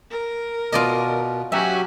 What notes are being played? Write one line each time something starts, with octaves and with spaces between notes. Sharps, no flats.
A#4
B2 F4 D5 D#5
F#3 C#4 F#4 G4 E5 G#5